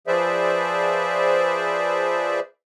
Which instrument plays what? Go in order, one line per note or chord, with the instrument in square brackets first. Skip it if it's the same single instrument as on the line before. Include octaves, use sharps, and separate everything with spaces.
[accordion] F3 G#4 B4 C5 D5 E5